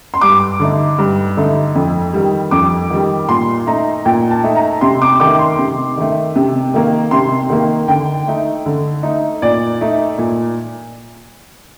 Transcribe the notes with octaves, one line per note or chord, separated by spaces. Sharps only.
C6
G2 D6
D3 A3 D#4
G2
D3 A3 D#4
F2
D#3 G3
F2 D6
D#3 G3
A#2 C6
A3 D#4 A#5
A#2 G5
A5
A3 D#4
A#5
C3 C6
D6
D#3 A3 D6
C6
C3
D#3 A3
C3
D#3 A#3
C3 C6
D#3 A#3
D3 G5
A3 D#4
D3
A3 D#4
A#2 D5
A3 D#4
A#2